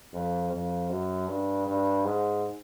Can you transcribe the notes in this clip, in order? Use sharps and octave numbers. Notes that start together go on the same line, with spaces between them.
F2
F2
F#2
G2
G2
G#2